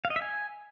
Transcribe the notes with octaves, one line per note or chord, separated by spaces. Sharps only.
F5
D#5
E5
G#5